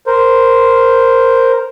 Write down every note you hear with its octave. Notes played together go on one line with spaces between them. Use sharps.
A#4 C5